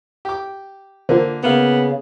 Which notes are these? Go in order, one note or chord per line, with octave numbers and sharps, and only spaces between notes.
G4 D6
D3 A#3 F4 A#4 C5
C#3 A#3 B3 F5